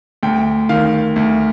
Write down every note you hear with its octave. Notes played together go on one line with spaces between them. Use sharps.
D2 G5
D#3 F5
D2